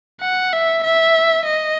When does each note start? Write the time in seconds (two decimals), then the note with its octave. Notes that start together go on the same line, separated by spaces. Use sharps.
0.21 F#5
0.53 E5
0.84 E5
1.46 D#5